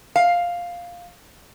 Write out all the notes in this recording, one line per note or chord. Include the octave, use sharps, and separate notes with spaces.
F5